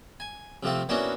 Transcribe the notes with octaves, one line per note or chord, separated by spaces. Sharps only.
G#5
C3 F3 A3 C4 F4
A#3 B3 C#4 D4 E4 F#4